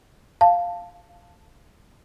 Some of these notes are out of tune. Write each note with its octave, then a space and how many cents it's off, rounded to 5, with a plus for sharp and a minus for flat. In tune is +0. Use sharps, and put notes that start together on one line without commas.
F5 +0 A5 +0